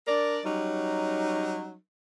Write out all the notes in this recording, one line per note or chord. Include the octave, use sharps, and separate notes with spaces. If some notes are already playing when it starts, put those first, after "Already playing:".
D4 A#4 D5
F#3 G3 C#4 D#4